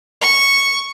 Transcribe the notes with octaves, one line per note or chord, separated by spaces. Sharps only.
C#6